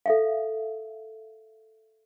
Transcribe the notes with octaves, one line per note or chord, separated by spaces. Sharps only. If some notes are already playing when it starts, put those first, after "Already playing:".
A4 E5 F5